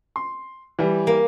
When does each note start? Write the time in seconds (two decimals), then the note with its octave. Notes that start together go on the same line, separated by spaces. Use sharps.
0.16 C6
0.79 E3 G3
1.07 A#3